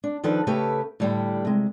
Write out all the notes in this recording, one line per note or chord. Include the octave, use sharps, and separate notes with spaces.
D4
D#3 F3 D4 A4 B4 F#5
C#3 A3 G4 A4 B4 C#5
A2 D3 G3 G4
C3 G#3